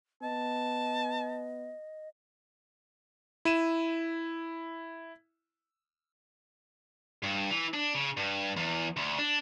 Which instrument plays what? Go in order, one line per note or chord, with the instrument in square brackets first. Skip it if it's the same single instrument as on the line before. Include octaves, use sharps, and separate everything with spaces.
[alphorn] B3 [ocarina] D#5 [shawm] A5
[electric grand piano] E4 D#7 E7
[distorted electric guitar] G2
E3
D4
C#3
G2
E2
D2
D4